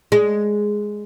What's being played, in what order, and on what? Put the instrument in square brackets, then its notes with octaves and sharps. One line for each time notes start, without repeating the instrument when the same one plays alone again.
[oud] G#3